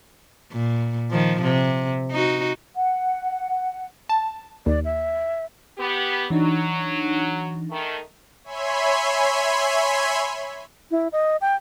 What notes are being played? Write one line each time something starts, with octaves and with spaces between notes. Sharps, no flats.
A#2
D#3 F3
C3
D#4 F#4
F#5
A5
D#2 D5
E5
B3 G4
E3 F#3 D4 D#4
D#3 A3
C#5 E5 G#5 B5 C6
E4
D#5
G5